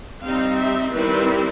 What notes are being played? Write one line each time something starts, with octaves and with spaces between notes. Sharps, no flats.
G3 C4 D#4 F5
E5
D#3 G3 C4 E4 B4